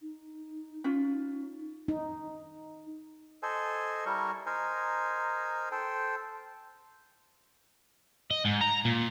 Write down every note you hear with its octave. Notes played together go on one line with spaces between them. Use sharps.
D#4
C#4 F4
D#4
A4 C5 D#5 G#5
G3 E4 A#4 C#6
D#4 A#4 C5 G#5
A4 C5 G5
D#5
G#2
A#5
A#2